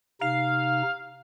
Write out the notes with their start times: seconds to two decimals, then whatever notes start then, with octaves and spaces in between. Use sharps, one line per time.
0.21 C3 D#4 F5